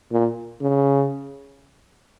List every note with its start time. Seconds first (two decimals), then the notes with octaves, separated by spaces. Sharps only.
0.11 A#2
0.61 C#3